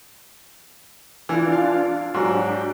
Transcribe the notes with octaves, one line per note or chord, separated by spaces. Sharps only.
E3 D4 F4
F5
G#2 F#3 D4 G4